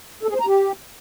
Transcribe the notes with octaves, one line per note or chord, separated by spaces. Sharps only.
A4
G#4
C5
A#5
G4